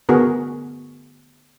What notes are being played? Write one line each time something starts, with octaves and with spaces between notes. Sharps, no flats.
D3 B3 F#4 G#4 A#4